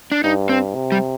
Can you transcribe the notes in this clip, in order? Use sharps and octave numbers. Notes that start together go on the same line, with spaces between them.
D4
G2 D#4
C4
C3
G3